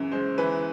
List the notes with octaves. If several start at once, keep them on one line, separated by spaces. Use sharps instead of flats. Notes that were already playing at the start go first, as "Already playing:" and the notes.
Already playing: F#2 C#3 E3
G#3 C5
E3 B4